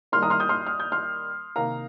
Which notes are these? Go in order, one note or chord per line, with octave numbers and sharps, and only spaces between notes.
D#3 G3 A#3 C6 F6
A#5 D#6
C6 F6
D#6 G6
C6 F6
F6
G6
C6 F6
C3 D#3 A#3 F5 A#5